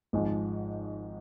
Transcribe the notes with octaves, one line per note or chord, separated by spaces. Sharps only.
G#1 G#2 F3 G#3